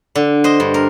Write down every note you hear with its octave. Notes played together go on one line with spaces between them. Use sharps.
D3
C5 D#5
G2
A#4